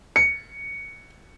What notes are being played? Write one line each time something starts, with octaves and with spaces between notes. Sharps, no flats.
C#7